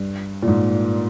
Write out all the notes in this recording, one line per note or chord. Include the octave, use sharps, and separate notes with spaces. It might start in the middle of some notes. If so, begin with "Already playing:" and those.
Already playing: G2
A#2
G#2